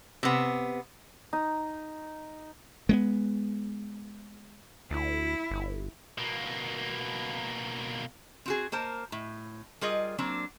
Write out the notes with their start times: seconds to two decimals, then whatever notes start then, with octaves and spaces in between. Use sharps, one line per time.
0.23 C3 B3
1.33 D#4
2.89 G#3 A#3 B3
4.91 D2 E4
5.51 G1
6.18 B2 A#3
8.46 C4 F#4 G#4
8.72 A#3 A#4 C5 A5
9.12 A2
9.81 G3 F4 G#4 A#4 D#5
10.18 F#3 A#3 C4 D4